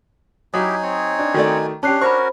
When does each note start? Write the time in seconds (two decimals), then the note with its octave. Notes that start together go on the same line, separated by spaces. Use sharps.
0.54 F#3 D#4 E4 G4 G#5 D#6
0.83 C4 C#5
1.19 D4
1.34 D#3 A3 F#4 D5
1.83 C#4 D4 G4 A5 F#6 C7
2.01 C#4 F#4 A#4 C5 B5 C#6